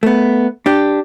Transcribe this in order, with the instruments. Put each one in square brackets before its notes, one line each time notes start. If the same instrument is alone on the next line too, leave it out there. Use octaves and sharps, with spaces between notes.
[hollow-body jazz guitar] A3 B3
D4 G4